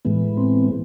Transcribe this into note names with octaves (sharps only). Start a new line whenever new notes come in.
A2 E3 G#3 B3
C4